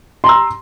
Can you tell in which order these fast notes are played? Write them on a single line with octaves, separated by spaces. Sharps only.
C6 A#5 E6